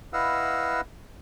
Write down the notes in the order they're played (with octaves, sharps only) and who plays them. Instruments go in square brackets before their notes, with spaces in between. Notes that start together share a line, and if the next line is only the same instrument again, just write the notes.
[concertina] E4 B4 D#5 F5 F#5 E6